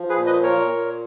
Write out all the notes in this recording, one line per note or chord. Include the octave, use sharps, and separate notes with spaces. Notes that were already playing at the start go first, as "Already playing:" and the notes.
Already playing: F3
G#4 B4
A#2
B4 D#5
A#2 A#4 C#5
A#2